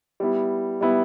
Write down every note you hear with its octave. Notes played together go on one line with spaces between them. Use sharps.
G3 B3 E4
G3 B3 E4